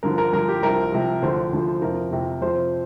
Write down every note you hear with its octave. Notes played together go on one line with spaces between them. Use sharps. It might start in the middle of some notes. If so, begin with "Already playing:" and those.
G2 D3 F3 A#4
A#4
G2 D3 F3 A#4
G4
C2 C3 F3 A#4
C2 C3 F3
D2 D3 F3 C5
D2 D3 F3
F2 C3 F3 A#4
F2 C3 F3
F2 C3 F3 C5